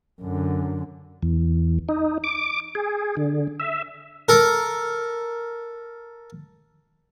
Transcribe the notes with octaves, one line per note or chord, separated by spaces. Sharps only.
F#2 D3
E2
D#4
D6
G#4
D3
E5
A4 A#4